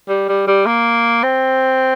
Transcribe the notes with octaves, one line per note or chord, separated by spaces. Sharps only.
G3
G3
G3
A#3
C4